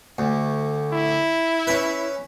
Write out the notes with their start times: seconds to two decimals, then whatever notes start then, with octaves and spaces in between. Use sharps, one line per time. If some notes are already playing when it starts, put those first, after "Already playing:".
0.18 D2
0.93 E4
1.67 C#4 B4